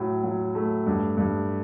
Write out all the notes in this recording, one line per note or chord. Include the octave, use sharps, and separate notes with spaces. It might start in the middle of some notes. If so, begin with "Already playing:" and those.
Already playing: A2 F#3
F#3
A3
G2
G2